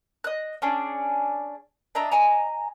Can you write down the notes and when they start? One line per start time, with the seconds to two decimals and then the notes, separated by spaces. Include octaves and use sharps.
0.24 D#5 F#6
0.62 C#4 D4 G#4
1.95 D4 D#5 E5 A#5
2.12 D#5 G#5 A#5